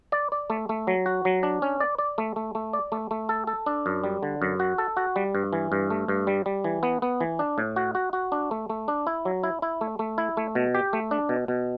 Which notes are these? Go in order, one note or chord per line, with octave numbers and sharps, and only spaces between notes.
D5
D5
A3
A3
F#3
F#4
F#3
D4
C#4
D5
D5
A3
A3
A3
D5
A3
A3
A4
A4
D4
F#2
G3
D3
F#2
F#4
A4
F#4
G3
G2
E3
G2
A3
G2
G3
G3
E3
B3
B3
E3
D4
A2
F#4
F#4
F#4
D4
A3
A3
D4
E4
F#3
E4
E4
A3
A3
E4
A3
B2
G4
A3
D4
B2
B2